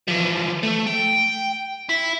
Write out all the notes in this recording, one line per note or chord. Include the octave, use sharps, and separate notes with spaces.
E3 F3
A3
G5
E4